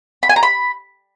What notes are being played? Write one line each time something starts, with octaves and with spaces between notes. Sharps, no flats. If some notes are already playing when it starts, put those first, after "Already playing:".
B5
G#5
A#5
B5